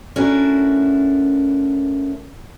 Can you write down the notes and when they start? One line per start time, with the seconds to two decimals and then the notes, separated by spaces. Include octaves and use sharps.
0.16 A3 C#4 D4 E4 F#4 A#4